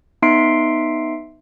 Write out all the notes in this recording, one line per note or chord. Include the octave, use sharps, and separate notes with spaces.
B3 D#4 E5 C6 C7 D7